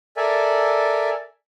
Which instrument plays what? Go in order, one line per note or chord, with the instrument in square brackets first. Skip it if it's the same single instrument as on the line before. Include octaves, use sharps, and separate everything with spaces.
[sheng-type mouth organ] A4 A#4 D5 E5 G#5